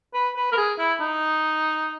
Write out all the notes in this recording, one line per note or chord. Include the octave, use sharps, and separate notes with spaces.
B4
B4
A#4
G#4
E4
D#4